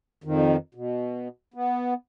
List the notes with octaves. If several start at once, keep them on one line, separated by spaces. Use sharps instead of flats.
F2 D#3
B2
B3